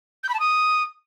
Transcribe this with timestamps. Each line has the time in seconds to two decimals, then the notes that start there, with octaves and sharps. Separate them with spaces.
0.23 G6
0.29 B5
0.34 A5
0.40 D#6